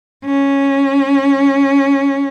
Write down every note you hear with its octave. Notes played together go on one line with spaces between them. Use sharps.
C#4